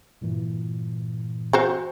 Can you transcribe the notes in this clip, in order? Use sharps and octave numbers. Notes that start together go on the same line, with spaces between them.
G2 A#2 E3
F#4 C5 G5